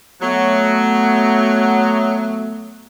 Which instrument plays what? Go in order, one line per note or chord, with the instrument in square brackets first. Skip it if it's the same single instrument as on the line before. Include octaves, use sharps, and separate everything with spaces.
[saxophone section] F#3 [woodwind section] A3 B3